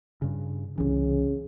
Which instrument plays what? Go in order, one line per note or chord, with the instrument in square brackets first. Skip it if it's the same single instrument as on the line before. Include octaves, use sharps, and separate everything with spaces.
[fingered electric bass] G2 C#3
[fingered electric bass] C2 E3 [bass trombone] C#3